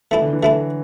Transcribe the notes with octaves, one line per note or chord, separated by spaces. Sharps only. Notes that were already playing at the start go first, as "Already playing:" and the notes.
E3 A3 E4 A4
D3
E3
F#3 A3 E4 A4